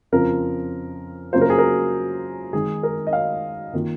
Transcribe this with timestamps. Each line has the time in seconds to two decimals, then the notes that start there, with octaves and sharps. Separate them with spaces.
0.12 F2 C#3 F3 C4 F4 A#4
1.33 C#3 F#3 A#3 F4 C5
1.41 A#4
1.50 G#4
1.58 A#4
2.53 D#3 G#3 D#4 G#4
2.83 A#4
3.07 D#5
3.13 F5
3.73 D#3 A#3 F4